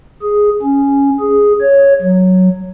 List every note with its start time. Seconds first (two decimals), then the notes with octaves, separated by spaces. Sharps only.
0.22 G#4
0.62 C#4
1.20 G#4
1.61 C#5
2.02 F#3